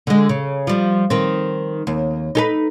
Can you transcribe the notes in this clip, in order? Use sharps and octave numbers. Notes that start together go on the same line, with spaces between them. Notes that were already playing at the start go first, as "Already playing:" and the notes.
D3 G#3
C#3
F3 G3
D#3 C4
D#2
D#4 A4 B4